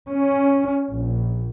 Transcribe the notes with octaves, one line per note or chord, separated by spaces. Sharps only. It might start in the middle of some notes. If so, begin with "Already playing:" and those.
C#4
A#1